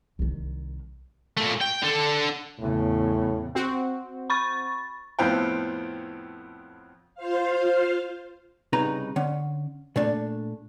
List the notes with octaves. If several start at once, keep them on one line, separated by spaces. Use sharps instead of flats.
C2 D#3
A#2 A3
G5
D3 A4
E2 A2 C#3
C4 F#4
B5 C#6 A6
F2 A2 B3 C4 F5 G5
F4 C5 F5
C2 C#3 D#4 B4 A#5
D3 C#4
A#2 A3 D4